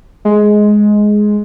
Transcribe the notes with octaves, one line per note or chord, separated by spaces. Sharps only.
G#3